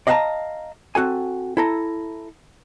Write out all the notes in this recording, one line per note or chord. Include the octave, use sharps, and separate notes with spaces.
D5 D#5 F5 F#5 A5 A#5
C4 F#4 A4 G#5
E4 A4 A#5